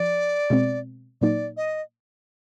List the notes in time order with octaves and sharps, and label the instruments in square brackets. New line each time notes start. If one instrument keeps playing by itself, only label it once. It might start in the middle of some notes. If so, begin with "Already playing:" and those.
Already playing: [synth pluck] F3 [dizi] D5
[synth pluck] B2 G#3 C4
[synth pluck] A#2 F#3 A#3 D#4 [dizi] D5
[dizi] D#5